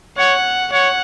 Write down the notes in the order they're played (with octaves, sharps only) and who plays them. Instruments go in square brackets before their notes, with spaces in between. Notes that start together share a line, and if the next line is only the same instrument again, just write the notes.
[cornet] C#5 [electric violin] F#5
[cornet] C#5 [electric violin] F#5